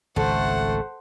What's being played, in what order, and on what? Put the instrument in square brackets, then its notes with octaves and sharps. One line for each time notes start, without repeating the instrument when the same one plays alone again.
[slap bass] G#1 C#2 [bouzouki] A3 [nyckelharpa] C5 F#5